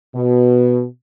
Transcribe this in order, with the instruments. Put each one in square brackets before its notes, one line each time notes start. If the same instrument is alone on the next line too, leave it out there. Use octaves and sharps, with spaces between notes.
[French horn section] B2